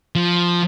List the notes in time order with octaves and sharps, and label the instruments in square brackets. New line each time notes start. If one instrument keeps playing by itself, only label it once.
[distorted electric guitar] F3